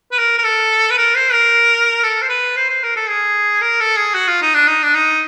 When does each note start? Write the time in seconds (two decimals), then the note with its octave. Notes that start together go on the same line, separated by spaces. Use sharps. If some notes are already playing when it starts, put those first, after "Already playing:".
0.12 B4
0.19 A#4
0.38 A#4
0.44 A4
0.91 B4
0.97 A#4
1.15 C5
1.32 A#4
2.03 A4
2.22 C5
2.29 B4
2.56 C5
2.69 C5
2.83 A#4
2.96 A4
3.09 G#4
3.61 A#4
3.80 A4
3.96 G#4
4.14 F#4
4.28 F4
4.42 D#4
4.54 D4
4.67 D#4
4.83 D4
4.94 D#4